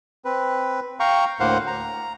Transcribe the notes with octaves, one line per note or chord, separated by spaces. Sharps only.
C4 B4
F5 G5 A#5 C#6
D2 A2 A#3 C5 F5 F#5
A#5